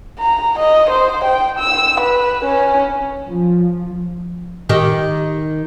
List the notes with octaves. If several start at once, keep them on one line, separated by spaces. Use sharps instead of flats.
A#5
D#5
C5
G5
E6
B4
C#4
F3
D#3 G4